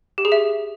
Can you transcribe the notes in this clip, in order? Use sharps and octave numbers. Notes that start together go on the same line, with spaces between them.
G4
G#4
E5